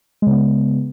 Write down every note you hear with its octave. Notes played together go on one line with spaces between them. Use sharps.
C#3 G#3 B3